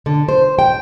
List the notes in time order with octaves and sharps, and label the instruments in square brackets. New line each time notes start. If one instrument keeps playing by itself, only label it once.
[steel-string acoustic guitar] D3
C5
G5